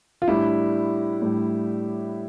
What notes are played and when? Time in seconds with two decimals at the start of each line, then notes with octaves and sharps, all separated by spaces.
0.22 F4
0.28 A2 G3 D4 E4
1.22 A2 G3 D4